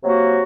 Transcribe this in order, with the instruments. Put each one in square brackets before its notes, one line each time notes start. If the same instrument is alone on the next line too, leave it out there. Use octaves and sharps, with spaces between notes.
[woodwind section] C3 F#3 A#3 F#4